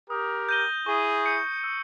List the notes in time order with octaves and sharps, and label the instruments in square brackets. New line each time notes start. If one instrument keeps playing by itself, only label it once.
[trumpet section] G4 A#4 [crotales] D#6
[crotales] G6 A#6 D#7 G7
[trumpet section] E4 G#4 [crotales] C#6
[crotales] G6 C#7
E6